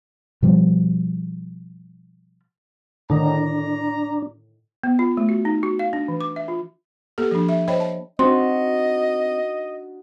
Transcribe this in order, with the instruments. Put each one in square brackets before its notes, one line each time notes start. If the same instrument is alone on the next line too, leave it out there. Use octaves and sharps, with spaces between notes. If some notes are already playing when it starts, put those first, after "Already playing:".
[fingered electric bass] B2 F3 G3
[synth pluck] A2 D3 D#3 [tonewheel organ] D4 [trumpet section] A#5
[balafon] B3
F4
A3
F#4
D#4
F#4
F5
D4
E3
D6
E5
F4
A#3 G4 A4
F3 D4
E5
C5 C#5 D#5 G5 B5
A5
[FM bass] C4 [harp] D4 D#4 F#4 [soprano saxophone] D#5 [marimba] C6